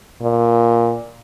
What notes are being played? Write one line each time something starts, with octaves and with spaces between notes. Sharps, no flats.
A#2